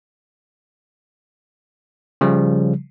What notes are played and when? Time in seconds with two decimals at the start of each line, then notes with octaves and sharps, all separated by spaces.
2.21 C#3 F3 G3